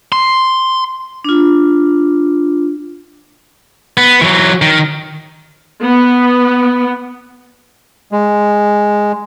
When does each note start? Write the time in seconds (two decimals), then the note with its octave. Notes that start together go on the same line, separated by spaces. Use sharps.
0.12 C6
1.25 D4 F4
3.97 B3
4.22 E3 F#3
4.62 D#3
5.82 B3
8.12 G#3